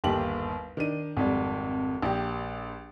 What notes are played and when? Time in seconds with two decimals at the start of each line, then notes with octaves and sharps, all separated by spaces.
0.04 G1 D#2 G4 F#7
0.77 D#3 D4 D#7
1.17 G#1 F2 G3
2.02 A#1 G4